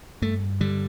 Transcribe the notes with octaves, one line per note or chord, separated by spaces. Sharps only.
G2 A3
D3 G3